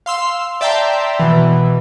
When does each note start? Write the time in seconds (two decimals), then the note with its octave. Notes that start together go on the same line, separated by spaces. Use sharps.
0.06 F5 C6 E6
0.61 D5 E5 G5 A5 A#5 C6
1.20 B2 E3